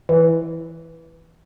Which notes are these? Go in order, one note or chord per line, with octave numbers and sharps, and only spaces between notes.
E3